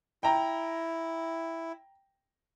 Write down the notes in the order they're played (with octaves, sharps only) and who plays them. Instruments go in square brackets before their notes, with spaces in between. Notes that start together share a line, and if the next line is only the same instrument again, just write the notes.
[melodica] E4 [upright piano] G5 A#5